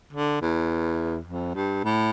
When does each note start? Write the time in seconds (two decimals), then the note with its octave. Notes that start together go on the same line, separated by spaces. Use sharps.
0.13 D3
0.41 E2
1.27 F2
1.55 G2
1.84 A2